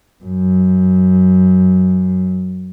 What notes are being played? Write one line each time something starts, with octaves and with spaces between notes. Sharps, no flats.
F#2